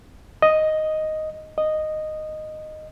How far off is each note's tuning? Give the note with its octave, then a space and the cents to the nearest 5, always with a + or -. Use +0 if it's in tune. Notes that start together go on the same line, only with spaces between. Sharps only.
D#5 +0
D#5 -10